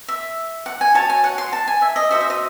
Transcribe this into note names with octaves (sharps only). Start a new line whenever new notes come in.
E5
F#5
G#5
F#4 C#5 A5
G#5
F#5
C6
A5
G#5
E5
D#5
F#4 C5 D#5 E5
E5
D#5